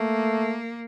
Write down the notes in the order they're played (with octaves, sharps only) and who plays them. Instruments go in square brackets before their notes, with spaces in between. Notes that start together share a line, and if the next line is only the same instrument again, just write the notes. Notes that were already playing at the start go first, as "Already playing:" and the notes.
Already playing: [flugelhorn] A3 [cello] A#3